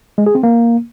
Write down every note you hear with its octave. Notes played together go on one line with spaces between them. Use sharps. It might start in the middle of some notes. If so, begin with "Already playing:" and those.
G#3
G#4
C4
A#3